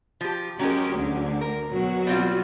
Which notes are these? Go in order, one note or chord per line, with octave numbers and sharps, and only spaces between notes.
F3 G4
F#3 G#3 C#4 G4 A#4
D2 D3
A#4
B2 F#3 F#4
G3 C4 F4